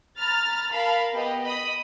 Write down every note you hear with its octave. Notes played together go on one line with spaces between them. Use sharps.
A#5 B5 F6 A6
A#4 F5 A5 B5
B3 G4 D#5
D#5 B5 D#6